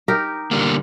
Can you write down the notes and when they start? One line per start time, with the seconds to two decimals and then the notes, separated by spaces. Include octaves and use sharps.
0.08 D#4 G4 A#4
0.51 D3 G3 A#3